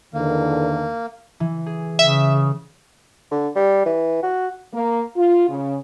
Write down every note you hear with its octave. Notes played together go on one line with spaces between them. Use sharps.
E2 D3 D#3 A#3
E3
G#4
C#3 E5
D3
G3
E3
F#4
A#3
F4
C#3